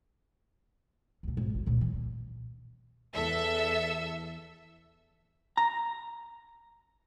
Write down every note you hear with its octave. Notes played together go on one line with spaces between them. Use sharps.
D2 B2
G#1 D#2
G#1
C#2 A#2
E3
D3
E2 A4 E5 E6
A#5